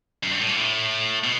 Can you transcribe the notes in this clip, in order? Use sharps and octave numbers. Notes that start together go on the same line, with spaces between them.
F#2
G2
A2
A#2
A2
B2